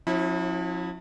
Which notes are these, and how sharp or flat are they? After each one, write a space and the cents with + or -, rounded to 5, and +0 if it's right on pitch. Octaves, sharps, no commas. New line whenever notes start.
F3 +40 C#4 -30 E4 -20